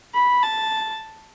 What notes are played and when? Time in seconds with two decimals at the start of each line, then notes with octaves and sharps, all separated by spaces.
0.14 B5
0.43 A5